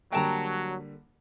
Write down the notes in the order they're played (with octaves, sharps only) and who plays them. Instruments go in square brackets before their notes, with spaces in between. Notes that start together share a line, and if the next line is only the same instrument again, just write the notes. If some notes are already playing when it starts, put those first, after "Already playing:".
[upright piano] D3 G3 A#3 [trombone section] F#3 [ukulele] G5 A5 A#5